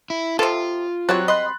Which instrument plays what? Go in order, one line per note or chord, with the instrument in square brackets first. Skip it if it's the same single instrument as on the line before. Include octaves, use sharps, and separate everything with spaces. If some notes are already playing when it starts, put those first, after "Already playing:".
[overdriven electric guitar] E4
[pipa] C3 F3 [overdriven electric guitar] F4 [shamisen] A4 C5
[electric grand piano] F#3 F#6 A6 [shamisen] G3 C4 F#4 [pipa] C#5
[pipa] D#5 [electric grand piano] B5 C6 F#6